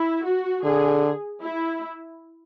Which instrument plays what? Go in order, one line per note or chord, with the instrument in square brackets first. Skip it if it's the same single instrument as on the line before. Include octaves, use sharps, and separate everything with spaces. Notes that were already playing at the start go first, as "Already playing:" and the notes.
Already playing: [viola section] E4
F#4
[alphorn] D3 [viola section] G#4
[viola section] E4